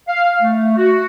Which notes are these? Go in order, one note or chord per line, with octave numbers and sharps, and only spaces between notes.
F5
A3
F#4